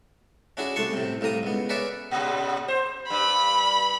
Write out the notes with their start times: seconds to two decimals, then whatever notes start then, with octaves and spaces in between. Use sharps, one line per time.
0.57 C#4 D4 E4 F#4 G#4
0.76 C2 A3 D4 A5 C6 C#6
0.93 A2 C3
1.21 C2 A2 A#3 A#5 D#6
1.43 C#2 B3
1.69 G#4 A#4 B4 C#5 D5 E5
2.11 A#2 C#3
2.68 C5
3.10 G2 B5